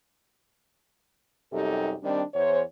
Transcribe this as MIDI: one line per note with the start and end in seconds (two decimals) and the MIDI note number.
1.52 1.94 42
1.52 1.94 48
1.52 1.94 55
1.52 1.94 63
1.52 1.94 67
1.52 1.94 69
2.03 2.22 51
2.03 2.22 55
2.03 2.22 60
2.03 2.22 62
2.34 2.62 40
2.34 2.62 72
2.34 2.62 73